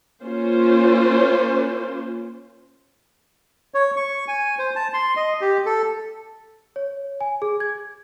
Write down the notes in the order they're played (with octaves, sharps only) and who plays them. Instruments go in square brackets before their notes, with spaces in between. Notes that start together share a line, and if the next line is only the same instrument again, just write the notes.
[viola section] A#3 C#4 F4 C5
[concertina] C#5
C#6
G#5
C5
A5
C6
D#5
G4
A4
[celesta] C#5
G#5
G#4
G#6